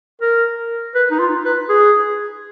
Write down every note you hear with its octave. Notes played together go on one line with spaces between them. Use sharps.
A#4
B4
D#4
F4
B4
G#4